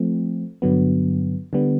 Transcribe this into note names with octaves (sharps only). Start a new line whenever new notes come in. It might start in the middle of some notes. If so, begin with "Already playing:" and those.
Already playing: F3 A3 C4
G2 D3 F#3 B3
D3 G3 B3